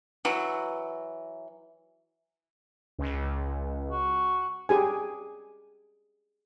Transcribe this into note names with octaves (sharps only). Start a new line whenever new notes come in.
E3 F#3
C#2
F#4
G4 G#4 G#5